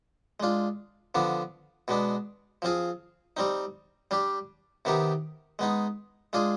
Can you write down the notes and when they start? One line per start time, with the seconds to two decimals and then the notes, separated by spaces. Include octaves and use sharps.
0.40 G#3 D4 F4
1.15 D3 F3 B3 D4
1.88 B2 G#3 B3 D4
2.62 F3 C4 F4 G#4
3.37 G3 C4 D#4
4.11 G3 D4 G4
4.85 C3 D#3 B3 D#4 G4
5.59 G#3 B3 D#4
6.33 G#3 D4 F4 G#4